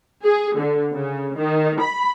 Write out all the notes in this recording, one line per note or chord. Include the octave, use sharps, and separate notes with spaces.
G#4
D3
C#3
D#3
B5